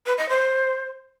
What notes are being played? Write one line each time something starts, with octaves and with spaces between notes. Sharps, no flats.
B4
D#5
C5